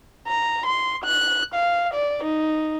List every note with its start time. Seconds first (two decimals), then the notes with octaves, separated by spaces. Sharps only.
0.28 A#5
0.66 C6
1.05 F#6
1.55 F5
1.94 D5
2.24 D#4